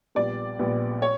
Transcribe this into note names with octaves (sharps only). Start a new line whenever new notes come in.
A#1 A#2 G3 B3 D5
A#1 A#2 G3 B3
C#5